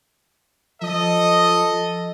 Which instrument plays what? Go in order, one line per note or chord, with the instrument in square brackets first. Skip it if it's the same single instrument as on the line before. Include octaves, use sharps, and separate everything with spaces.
[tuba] F3 [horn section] A4 D#5